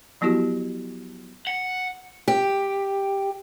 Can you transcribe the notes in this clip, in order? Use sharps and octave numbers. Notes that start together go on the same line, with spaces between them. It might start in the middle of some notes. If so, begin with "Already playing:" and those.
F3 F#3 B3 E4 F#4 G4
F#5
G4